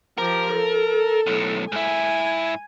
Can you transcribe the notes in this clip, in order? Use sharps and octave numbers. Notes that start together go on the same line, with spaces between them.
F3 G4 A#4
A4
B1 A2
G#2 E4 G#5